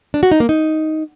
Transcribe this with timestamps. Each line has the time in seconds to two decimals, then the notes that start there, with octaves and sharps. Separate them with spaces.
0.14 D4
0.23 F#4
0.31 D#4
0.40 A#3
0.49 D#4